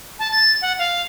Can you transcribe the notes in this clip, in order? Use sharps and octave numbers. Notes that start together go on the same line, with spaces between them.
A5
A6
F#5
F5